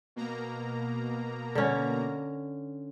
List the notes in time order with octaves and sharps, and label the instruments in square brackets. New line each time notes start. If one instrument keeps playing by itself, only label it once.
[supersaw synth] B2 A#3 A#5
[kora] D3 C#4